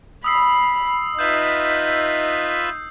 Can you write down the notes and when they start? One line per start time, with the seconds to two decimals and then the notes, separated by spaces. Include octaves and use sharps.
0.24 B5 D#6 E6 C7
1.19 D#4 F4 B4 E5 G6